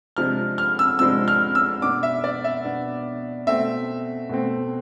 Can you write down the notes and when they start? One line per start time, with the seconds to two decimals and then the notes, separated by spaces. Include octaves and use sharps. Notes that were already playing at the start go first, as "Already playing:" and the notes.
0.17 C3 F3 G#3 D4 F6
0.58 F6
0.79 E6
0.99 C3 F3 G#3 D4 E6
1.28 F6
1.55 E6
1.82 B2 B3 D4 D6
2.03 E5
2.24 D5
2.44 E5
2.64 B2 B3 D4
3.47 B2 A3 C4 E5
4.29 B2 A3 C4